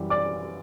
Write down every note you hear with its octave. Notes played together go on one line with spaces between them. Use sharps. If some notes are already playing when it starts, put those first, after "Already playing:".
Already playing: F#2 E3 G3
D5 D6